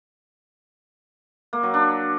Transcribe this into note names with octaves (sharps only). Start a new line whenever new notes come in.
A#3
F#3
D4